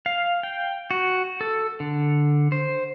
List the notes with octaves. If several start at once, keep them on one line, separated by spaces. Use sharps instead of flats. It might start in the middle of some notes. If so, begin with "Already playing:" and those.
F5
G5
F#4
A4
D3
C5